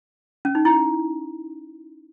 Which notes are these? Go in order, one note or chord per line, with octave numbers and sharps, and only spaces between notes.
C#4
D#4
E4